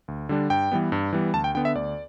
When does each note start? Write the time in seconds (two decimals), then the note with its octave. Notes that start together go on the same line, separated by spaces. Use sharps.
0.08 D2
0.29 D3 G3 D4
0.50 G2 G5
0.72 E3 G3 B3
0.92 G2
1.13 E3 G3 B3
1.34 D2 A5
1.44 G5
1.55 D3 B3 G5
1.65 E5
1.75 D2 D5